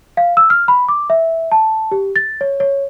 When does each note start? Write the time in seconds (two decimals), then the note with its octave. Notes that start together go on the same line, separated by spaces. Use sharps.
0.17 F5
0.37 E6
0.50 F6
0.68 B5
0.88 D6
1.10 E5
1.52 A5
1.92 G4
2.16 A6
2.41 C#5
2.60 C#5